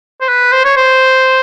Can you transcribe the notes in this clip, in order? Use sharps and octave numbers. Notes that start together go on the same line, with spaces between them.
C5
B4
C5
C#5
C5